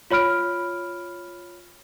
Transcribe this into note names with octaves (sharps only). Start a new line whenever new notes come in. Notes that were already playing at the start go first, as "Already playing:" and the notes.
F4 C#5 B5 F6 D7